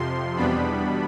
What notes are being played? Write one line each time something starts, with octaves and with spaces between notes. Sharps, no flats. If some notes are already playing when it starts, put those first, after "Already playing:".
Already playing: F2 C3 F3 C6
E2 B2 G3 B3 D4 B5